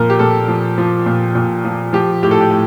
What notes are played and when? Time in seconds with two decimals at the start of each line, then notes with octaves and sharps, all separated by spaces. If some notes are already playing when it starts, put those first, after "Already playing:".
Already playing: A#2 F3 A#4
0.10 G4
0.19 A#2 A4
0.48 F3
0.78 F3
1.06 A#2
1.35 A#2
1.65 F3
1.93 F3 G4
2.23 A2 G4
2.31 A4
2.41 G4
2.51 A2